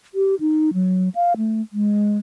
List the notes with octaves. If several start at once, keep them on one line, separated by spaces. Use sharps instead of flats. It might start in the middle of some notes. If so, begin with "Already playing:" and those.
G4
D#4
F#3
F5
A3
G#3